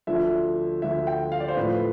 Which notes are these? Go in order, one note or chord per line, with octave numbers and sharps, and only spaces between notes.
D2 D3 F3 E5
D2 D3 F3 E5
G5
F5
D5
C5
A2 F3 A3 B4